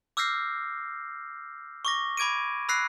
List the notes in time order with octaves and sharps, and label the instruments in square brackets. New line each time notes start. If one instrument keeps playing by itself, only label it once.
[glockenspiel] D6 E6 F6 G6 A#6 C7
C#6 D6 A#6
B5 D6 G#6 D7 D#7
B5 E6 F#6 A#6 C7